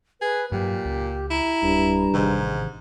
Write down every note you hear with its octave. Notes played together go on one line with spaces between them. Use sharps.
G#4 B4
G2 A#2 F#3 G4
C#2
E4 A#5
D1 G2
A1 G#2 C3 D#3